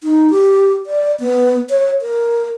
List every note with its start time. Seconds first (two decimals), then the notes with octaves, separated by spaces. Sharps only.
0.03 D#4
0.30 G4
0.86 D5
1.20 B3
1.70 C#5
2.02 A#4